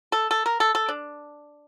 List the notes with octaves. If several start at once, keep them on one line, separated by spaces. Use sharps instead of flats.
A4
A4
A#4
A4
A4
D4